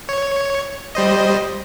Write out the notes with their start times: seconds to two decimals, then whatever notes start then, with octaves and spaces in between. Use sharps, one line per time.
0.09 C#5
0.95 G3 C5 D#5